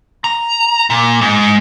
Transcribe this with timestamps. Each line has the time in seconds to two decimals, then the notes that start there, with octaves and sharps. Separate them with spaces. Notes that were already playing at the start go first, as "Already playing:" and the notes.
0.24 A#5
0.90 A#2
1.21 G#2